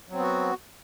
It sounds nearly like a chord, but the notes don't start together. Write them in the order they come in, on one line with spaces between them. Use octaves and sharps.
F#3 C4 B3 F#4